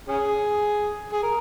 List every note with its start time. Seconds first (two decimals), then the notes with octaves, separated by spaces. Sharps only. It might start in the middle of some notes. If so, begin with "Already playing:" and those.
0.08 C#4 G#4
1.13 G#4
1.23 A#4